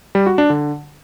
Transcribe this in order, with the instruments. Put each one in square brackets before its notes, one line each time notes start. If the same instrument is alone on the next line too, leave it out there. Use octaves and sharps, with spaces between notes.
[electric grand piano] G3
F#4
D4
D3